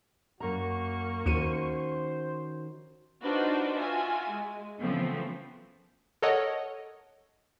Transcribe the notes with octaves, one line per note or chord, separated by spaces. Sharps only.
F#2 A#3 F#4 A#5 C#6
D#2 D#3 C#4 F#4 C5 C#7 D#7
D4 D#4 F4 F#4 B4 C5
F4 F#4 E5 G#5
G#3
C#3 E3 F3 A3 B3 C4
A4 A#4 C#5 D#5 F#5